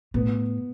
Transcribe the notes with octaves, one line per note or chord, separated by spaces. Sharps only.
A2 B3